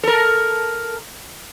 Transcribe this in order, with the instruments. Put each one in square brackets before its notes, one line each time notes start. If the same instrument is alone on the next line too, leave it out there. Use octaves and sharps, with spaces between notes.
[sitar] A4 A#4